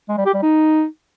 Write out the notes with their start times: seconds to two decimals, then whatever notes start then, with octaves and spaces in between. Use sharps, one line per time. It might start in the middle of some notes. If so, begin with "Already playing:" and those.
0.09 G#3
0.17 G3
0.26 G4
0.34 G3
0.42 D#4